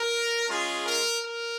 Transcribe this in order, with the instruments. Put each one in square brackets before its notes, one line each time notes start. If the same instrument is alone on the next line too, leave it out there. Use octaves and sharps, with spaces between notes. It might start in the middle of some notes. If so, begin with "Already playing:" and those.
Already playing: [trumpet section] A#4
G#3 C#4 F4 G#4
A#4
A#4